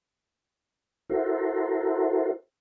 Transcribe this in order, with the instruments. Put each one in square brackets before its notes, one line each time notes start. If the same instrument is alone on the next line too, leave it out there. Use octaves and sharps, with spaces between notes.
[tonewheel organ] E4 F#4 A4 A#4 C5